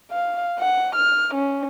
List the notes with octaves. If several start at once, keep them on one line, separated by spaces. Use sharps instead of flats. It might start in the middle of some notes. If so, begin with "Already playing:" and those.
F5
F#5
F6
C#4